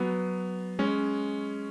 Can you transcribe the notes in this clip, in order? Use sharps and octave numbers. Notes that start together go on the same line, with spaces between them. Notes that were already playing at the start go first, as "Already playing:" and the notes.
Already playing: F#3 B3
G#3 C#4